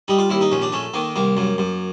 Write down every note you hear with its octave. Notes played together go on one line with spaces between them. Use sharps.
G3 D#4
F4
D#2 E4
D#4
A#1 C#4
D4
A3 C#4
D#3 A#3
C2 A#3
F#2
F#2